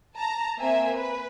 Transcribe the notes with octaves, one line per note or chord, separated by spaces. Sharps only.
A5 A#5
A#3 C4 E5 G#5
B4